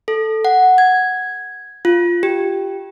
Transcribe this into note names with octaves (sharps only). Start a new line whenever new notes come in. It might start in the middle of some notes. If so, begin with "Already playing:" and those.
A4
F#5
G#6
F4
G4